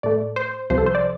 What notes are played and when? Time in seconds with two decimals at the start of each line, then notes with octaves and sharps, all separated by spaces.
0.03 A2 A3 D5
0.36 C5
0.70 C2 C3 F3 C5
0.78 A4
0.86 C5
0.95 D5